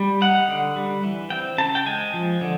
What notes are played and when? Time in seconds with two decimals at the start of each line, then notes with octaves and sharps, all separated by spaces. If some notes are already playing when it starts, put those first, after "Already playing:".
Already playing: G3
0.21 D#4 F#5
0.48 D3
0.76 G3
1.03 E3
1.30 C4 G5
1.58 C#3 A5
1.75 G5
1.86 G#3 G#5
2.14 F3
2.41 D3